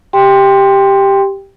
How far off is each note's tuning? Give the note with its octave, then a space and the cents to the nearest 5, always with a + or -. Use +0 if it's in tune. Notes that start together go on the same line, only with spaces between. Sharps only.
G4 +0 G5 +15 C6 +0